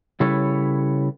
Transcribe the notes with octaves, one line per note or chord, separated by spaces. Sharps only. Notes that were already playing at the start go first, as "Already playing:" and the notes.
C#3 G3 E4 A4 B4 C#5